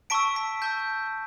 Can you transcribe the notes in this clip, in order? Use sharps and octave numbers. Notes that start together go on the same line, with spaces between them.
A5 C#6 E6 B6 D7
B6 D7
A5 C#6 E6 G6